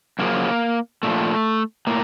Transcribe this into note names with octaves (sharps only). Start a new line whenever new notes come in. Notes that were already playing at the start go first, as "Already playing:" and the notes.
F#2 C#3 F3 A#3
A#2 F3 A3
A2 A#3